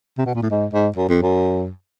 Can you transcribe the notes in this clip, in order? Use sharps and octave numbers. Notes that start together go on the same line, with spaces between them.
C3
B2
A#2
A2
G#2
G#2
F#2
F2
F#2